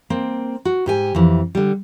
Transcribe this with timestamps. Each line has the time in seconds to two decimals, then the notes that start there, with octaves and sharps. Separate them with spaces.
0.10 A#3 C4
0.65 F#4
0.86 G#2 G4 G#5
1.15 F2 E3
1.55 D3 G3